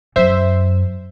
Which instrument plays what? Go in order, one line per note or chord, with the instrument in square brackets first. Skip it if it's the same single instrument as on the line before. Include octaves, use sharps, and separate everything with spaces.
[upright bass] F#2 [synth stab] C5 E5